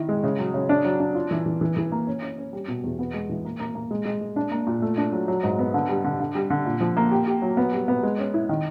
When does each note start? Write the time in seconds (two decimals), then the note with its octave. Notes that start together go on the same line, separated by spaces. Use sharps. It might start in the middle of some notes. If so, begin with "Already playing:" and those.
Already playing: D#3 E4
0.09 G#3
0.23 C#3
0.39 F#3
0.54 C#3
0.69 D4
0.85 F#3
1.00 D4
1.15 F4
1.31 E3
1.46 E3
1.61 E3
1.77 E3
1.92 A#3
2.07 C#4
2.22 C#4
2.38 C#4
2.53 G3
2.68 B2
2.84 E2
2.99 B3
3.14 G#3
3.29 E3
3.45 A#3
3.60 A#3
3.75 A#3
3.91 G#3
4.05 G#3
4.21 G#3
4.36 D4
4.51 A#3
4.67 A#2
4.82 A3
4.98 D4
5.13 F#3
5.28 F#3
5.43 G#2
5.59 B3
5.74 D3
5.89 G3
6.04 D3
6.20 D3
6.35 G3
6.50 D3
6.65 A#2
6.81 F3
6.97 A#3
7.11 G4
7.27 G4
7.42 F#3
7.57 B3
7.72 G3
7.88 B3
8.03 G#3
8.18 C#4
8.34 E4
8.49 D#3